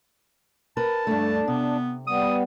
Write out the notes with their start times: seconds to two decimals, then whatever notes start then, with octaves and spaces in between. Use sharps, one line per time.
0.77 A#4 B4 A5
1.07 G2 A3 D4
1.48 C3 B3
2.07 G3 B3 D#6